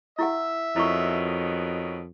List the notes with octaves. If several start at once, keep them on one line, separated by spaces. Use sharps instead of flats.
E4 G4 E5 F#5
F2 B2 D#3 F#3 E4 C#6